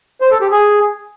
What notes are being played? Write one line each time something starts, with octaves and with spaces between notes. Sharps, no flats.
C5
A4
G4
G#4